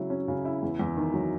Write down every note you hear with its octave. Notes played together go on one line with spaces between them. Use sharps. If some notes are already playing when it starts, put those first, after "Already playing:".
Already playing: C#3 F#3 E4
C#4
C#3
E4
E2
E2
D#3
F#3